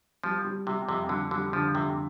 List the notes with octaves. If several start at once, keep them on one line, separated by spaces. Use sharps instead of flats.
F3 G3
G3
C3 G3
F2 C3
D3 G3
D3 G3
D3 F3
F2 C3